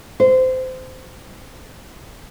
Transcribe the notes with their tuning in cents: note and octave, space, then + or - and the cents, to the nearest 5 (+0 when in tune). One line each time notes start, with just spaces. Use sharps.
C5 -20